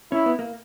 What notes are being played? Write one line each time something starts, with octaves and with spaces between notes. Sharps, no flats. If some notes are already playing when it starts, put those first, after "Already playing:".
C#4 E4
B3
A#3